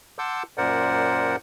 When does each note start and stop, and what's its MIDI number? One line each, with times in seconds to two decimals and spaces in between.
0.19 0.43 78
0.19 0.43 81
0.19 0.43 84
0.19 0.43 86
0.19 0.43 88
0.19 0.43 91
0.58 1.36 42
0.58 1.36 46
0.58 1.36 70
0.58 1.36 72
0.58 1.36 74
0.58 1.36 78